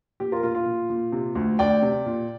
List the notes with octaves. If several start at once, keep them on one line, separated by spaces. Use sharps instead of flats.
A#2 G4
F4 A#4
A#2 F4
F4
A#2
A#2
C3
D2
D2 D5 G5
C3
A#2